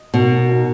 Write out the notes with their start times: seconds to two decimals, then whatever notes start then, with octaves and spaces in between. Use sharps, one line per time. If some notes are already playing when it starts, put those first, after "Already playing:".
Already playing: D#5
0.14 B2 D#4 F#4 A#4
0.49 D#4 F#4 A#4